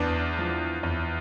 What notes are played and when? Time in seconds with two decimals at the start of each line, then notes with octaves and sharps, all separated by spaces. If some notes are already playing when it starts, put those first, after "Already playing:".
Already playing: E2 B3 D4
0.39 F3
0.83 E2